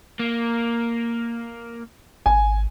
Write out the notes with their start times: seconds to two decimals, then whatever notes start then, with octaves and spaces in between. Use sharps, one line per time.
0.19 A#3
2.26 G#1 G#5